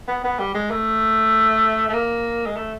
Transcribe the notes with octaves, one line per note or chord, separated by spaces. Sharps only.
B3
B3
G3
G#3
A3
A3
A#3
G#3
A3